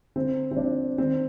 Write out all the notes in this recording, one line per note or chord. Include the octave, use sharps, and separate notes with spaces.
D3 C4
C4
F3 A#3 D4
D#3 C4